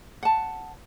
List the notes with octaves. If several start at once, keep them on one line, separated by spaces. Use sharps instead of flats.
F#5 A5